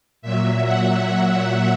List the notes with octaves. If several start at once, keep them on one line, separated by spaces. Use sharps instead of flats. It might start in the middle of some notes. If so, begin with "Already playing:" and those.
A#2 F#3 E5
F#5
F#5